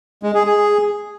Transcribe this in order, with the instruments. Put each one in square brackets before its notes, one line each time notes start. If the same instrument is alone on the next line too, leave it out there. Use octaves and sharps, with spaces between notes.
[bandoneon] G#3
G#4
G#4